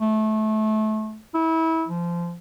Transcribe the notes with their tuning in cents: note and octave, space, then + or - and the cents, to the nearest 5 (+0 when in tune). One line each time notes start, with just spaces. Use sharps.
A3 -25
E4 -25
F3 -20